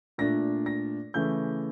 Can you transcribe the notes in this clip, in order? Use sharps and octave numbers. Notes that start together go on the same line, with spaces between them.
A#2 A3 D4 A#6
A#6
C#3 E3 A3 G6